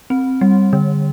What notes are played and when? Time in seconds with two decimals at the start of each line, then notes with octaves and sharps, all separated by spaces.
0.10 C4
0.41 G3
0.73 D3